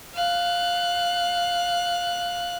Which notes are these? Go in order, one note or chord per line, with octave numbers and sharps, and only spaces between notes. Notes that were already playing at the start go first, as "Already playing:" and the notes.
F5 F#6